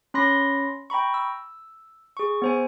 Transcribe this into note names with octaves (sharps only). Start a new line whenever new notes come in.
C#4 B5 C6 A#6
G5 A#5 B5 C#6
E6
G#4 C#6
B3 C5 G#5